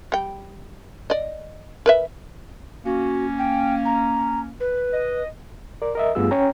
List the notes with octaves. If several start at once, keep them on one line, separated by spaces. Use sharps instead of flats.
G3 G5
D5 D#5
A#4 B4 E5
A#3 C#4 F#4
G5
A#5
B4
D#5
A#4 D5
A#4 D#5 E5
G2 A3 B3 F4 G#4 E6
C#4 C#5 G5 A#5